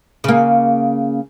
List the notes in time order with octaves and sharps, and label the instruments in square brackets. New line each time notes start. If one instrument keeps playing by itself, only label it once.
[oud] C#3 A#3